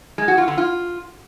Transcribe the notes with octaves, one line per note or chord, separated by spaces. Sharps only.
G#3
F#4
F4
D3
F4